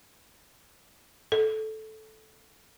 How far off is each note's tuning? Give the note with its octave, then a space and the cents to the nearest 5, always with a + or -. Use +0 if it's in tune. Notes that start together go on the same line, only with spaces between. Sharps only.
A4 -10